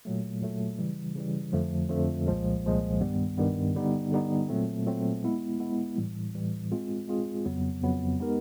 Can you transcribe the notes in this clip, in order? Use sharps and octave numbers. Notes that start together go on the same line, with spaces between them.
A#2 F#3 A3
A#2 F#3 A3
C#3 E3 G3
C#3 E3 G3
F2 D3 F3 A3
F2 D3 F3 A3
C2 A#2 F3 G#3
C2 A#2 F3 G#3
G2 D#3 G3 B3
G2 D#3 G3 B3
D3 G3 B3 D#4
D3 G3 B3 D#4
A#2 F#3 A3 C4
A#2 F#3 A3 C4
G#3 B3 E4
G#3 B3 E4
A2 E3 G3
A2 E3 G3
G#3 C4 F4 G#4
G#3 C4 F4 G#4
F2 C#3 F#3 B3
F2 C#3 F#3 B3
G#3 B3 D#4 G4 A#4